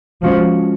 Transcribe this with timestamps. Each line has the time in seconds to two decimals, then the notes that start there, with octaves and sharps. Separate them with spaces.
0.23 F3 G#3 C#4 F#4